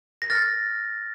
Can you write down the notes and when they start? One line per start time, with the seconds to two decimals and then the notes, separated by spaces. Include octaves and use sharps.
0.22 A#6
0.30 F6 A6